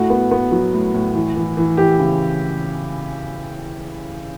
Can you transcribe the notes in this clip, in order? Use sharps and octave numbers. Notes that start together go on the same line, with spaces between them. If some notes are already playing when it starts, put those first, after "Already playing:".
Already playing: A2 A3 F#4
B3
B3
F#3
A2
A2
E3
E3
E3
E3 G4
C#3